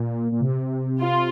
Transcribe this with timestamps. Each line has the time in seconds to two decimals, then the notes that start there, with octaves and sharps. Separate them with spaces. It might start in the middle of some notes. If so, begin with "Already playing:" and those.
Already playing: A#2
0.32 A#2
0.41 C3
1.00 F4